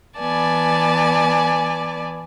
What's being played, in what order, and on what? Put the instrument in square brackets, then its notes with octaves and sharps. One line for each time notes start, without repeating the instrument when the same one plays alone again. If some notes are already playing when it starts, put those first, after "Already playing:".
[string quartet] E3 B3 D5 G#5 A5